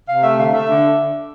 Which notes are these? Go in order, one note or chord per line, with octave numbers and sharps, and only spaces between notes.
C3 F5
A3 E5
D3 F5
A3 E5
D3